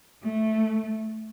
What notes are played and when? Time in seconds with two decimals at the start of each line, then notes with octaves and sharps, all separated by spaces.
0.23 A3